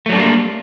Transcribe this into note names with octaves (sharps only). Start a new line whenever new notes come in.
F#3 G3 A3 A#3 D4